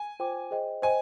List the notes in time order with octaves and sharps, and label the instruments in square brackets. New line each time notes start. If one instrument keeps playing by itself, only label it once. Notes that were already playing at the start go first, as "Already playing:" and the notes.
Already playing: [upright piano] G#5
[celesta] F4 C5 G5 D6
G#4 C5 D#5 G5
[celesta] C5 D#5 G5 [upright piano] G#5